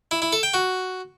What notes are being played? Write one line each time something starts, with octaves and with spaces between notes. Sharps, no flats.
E4
E4
A4
G5
F#4